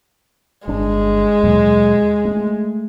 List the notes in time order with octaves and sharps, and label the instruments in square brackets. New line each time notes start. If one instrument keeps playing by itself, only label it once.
[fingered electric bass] G1 D4 [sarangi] G#3
[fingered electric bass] D#2 B2 F#3
A3